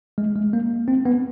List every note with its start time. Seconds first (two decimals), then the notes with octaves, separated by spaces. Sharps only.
0.18 G#3
0.36 G#3
0.53 A#3
0.88 C4
1.05 B3